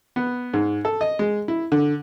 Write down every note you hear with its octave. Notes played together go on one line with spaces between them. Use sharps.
B3
G#2
A4
D#5
G#3
E4
D3